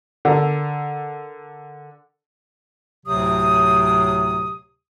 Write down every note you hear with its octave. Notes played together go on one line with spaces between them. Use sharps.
D3 A4 A#4
D2 A2 C3 F#3 D#6